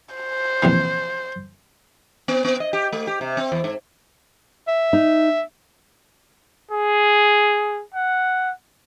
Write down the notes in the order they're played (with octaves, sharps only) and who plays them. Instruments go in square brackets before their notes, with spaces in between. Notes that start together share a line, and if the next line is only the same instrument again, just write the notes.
[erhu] C5
[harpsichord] A#1 C3 E3
[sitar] B3
B3
D#5
G4
A3
G4
C3
C4
E2
G#2
[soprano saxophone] E5
[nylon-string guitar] D#4
[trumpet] G#4
F#5